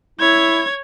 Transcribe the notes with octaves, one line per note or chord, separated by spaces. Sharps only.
E4 C#5 G#6